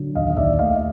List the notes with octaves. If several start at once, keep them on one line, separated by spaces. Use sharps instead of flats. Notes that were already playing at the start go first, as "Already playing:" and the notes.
Already playing: D3 F#3
D#2 D#5 F5
D#5
D#2 D5 E5
A3 D#5 F5